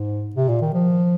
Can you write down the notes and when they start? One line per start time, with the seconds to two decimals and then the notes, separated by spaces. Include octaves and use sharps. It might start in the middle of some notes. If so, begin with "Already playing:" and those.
Already playing: G#2
0.35 C3
0.48 A#2
0.61 D#3
0.74 F3